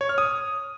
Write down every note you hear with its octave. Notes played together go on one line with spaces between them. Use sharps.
C#5
F6
D#6